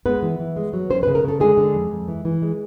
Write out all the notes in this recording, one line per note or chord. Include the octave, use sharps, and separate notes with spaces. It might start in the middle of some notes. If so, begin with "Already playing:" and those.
G#3 B3 B4
E3
E3
G#3
F#3
C#4 C5
C#3 B4
A#4
C#3 A4
D3 G#3 G#4
D3
F2
F2
E3
E3
G#3